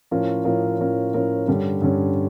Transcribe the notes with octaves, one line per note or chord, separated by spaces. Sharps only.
A2 F3 C#4 F4 A#4
A2 F3 C#4 F4 A#4
A2 F3 C#4 F4 A#4
A2 F3 C#4 F4 A#4
G2 D3 G3 C#4
G2 D3 G3 C#4